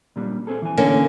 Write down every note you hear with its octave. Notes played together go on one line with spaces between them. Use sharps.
A#2 G3 D4
C4 G#4 A4
E3 G#5
D3 A#3 C#4